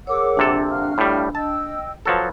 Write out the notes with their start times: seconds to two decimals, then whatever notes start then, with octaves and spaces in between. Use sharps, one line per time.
0.07 G#4 A#4 C#5 F#5 D6 E6
0.37 A#1 C3 D4 A4
0.70 F#4 F5 F6
0.98 A2 G3
1.35 D#5 G5 A5 E6
2.05 F3 F#3 A4 B4